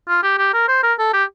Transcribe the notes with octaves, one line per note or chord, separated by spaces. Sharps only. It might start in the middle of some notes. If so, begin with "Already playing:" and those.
F4
G4
G4
A#4
C5
A#4
A4
G4